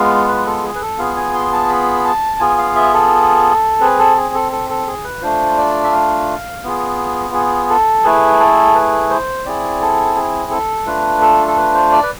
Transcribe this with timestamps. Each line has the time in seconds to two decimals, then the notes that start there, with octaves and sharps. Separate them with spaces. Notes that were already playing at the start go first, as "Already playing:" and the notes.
Already playing: G#3 B3 F4 F5
0.28 B4
0.46 A4
0.63 G#4
0.75 B4
0.81 A4
0.99 B3 F4 G#4 F5
1.16 G#5
1.33 C6
1.52 A5
1.69 B5
2.04 A5
2.39 B3 F4 G#4 G#5
2.58 F5
2.76 E5
2.93 A4
3.81 C4 G#4 B4
3.99 A4
4.17 G#4
4.34 A4
4.52 A4
4.70 A4
4.87 G#4
5.04 B4
5.22 A3 D4 F4 C5
5.58 D5
5.84 E5
5.92 F5
6.63 B3 F4 G#4
7.34 G#4
7.70 A4
8.04 A3 E4 G#4 B4
8.40 A4
8.75 B4
9.10 C5
9.46 C4 E4 G#4 D5
9.82 A4
10.16 G#4
10.51 A4
10.86 A3 D4 F4 B4
11.22 A4
11.47 A4
11.57 B4
11.74 C5
11.92 D5
12.03 B4